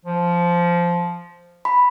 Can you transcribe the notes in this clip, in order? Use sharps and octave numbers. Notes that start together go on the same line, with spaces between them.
F3
B5